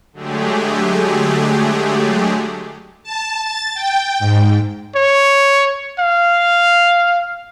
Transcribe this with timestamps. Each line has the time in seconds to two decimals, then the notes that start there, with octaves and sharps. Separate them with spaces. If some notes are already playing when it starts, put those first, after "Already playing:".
0.13 D3 F#3 G#3 A3 G4 G#4
3.03 A5
3.41 A6
3.74 G5
4.19 G#2
4.96 C#5
5.99 F5